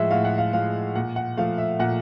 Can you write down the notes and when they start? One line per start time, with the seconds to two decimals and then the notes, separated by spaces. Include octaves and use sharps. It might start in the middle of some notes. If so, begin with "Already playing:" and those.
Already playing: A2 F3 G#3 E5 F#5
0.11 A2 F5
0.25 F#5
0.38 F5
0.53 F3 G#3 F5
0.95 A#2 F#5
1.16 F#5
1.37 F3 A3 F5
1.58 E5
1.79 A#2 F#5